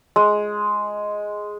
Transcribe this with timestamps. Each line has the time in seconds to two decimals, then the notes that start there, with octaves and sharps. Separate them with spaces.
0.16 G#3